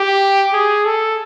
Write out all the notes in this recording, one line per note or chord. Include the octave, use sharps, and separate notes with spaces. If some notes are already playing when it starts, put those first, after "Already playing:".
Already playing: G4
G#4
A4